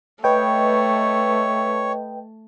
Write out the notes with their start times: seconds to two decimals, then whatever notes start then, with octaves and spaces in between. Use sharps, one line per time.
0.24 A3 B4 C#5 D#5 G5